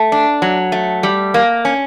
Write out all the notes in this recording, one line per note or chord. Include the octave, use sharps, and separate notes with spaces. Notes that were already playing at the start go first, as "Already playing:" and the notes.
Already playing: A3
D4
F#3
A3
G3
A#3
C#4